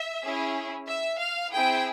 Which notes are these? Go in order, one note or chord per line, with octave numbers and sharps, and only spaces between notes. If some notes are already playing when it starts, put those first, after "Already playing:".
Already playing: E5
C#4 E4 G#4
E5
F5
C4 E4 G#4 G5